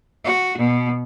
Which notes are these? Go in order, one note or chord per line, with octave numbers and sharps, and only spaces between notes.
F#4
B2